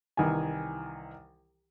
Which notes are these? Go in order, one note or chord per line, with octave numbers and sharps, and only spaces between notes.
C2 D#3 E3 G#5